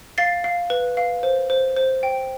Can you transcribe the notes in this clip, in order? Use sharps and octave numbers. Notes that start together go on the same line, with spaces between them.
F5 A6 C7
F5
B4
F5
C5
C5
C5
G5